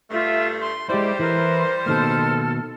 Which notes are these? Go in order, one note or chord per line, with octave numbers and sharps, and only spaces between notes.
G2 G3 A3 F4 E5
C6
G3 G#3 E4 G4 C5 D5
E3 E4 A#4 B4 C6
B2 D#3 A#3 A4 F6